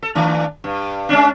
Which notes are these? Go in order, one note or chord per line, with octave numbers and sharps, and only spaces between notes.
A4
D#3 A3 D4
G2
G#3 C#4 D4